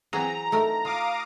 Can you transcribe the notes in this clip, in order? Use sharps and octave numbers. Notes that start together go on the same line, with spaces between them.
E3 F#3 C4 G#4 A#5
A3 D#4 A#4
F4 F5 D6 D#6